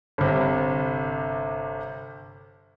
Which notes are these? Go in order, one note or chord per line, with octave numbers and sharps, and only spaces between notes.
G1 C3